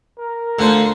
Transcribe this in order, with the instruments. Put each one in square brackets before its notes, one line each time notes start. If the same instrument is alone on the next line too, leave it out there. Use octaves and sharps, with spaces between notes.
[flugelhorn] A#4
[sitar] D3 [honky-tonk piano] A3 [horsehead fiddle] F4 C5